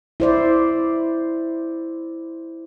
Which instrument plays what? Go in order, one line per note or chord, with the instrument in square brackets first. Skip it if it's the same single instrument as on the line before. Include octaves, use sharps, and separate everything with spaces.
[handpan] E4 C5 D5